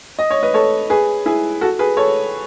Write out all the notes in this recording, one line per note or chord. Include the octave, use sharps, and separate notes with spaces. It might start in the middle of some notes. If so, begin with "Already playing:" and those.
D#5
C#5
B4 D#5
A4 C#5
G#4 B4
E4 G#4
F#4 A4
G#4 B4
A4 C#5